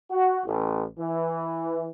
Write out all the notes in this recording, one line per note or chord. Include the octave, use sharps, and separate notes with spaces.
F#4
A1
E3